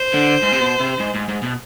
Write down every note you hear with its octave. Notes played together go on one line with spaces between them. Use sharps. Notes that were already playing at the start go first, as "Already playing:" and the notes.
Already playing: C5
D3
G#2
C3
B2
C3
G#2
G#2
G#2
B2